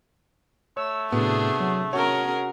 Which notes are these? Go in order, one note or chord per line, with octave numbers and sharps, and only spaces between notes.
A3 C#5 E6
A2 C3 B3 D4 F#4 G#4
F#3
C#4 F#4 G#4 A#4 C#5 A5 C#6